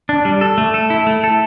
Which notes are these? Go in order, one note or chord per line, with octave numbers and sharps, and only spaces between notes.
D4
G3
A4
A3
A4
E4
A3
A4